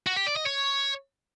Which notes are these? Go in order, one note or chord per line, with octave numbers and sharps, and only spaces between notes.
F#4
G4
D5
D#5
C#5